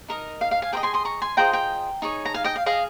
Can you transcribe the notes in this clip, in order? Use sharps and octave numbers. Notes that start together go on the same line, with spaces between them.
D#4 A#4 D#5
F5
F5
F5 G#5
G#4 C5 D#5 G5 A#5
G#5 C6
C6 D#6
A#5 C#6
G#5 C6
F4 G#4 C5 D#5 G5 A#5
G5 A#5
D#4 G#4 C#5
A#5
F5 G#5
D#5 G5
F5
G#4 D#5 F5